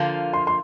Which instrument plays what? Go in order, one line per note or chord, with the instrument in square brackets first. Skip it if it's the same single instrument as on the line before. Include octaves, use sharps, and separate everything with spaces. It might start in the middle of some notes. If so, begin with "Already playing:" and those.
Already playing: [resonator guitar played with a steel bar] D3 F3 A#3 F4
[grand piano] C6
C6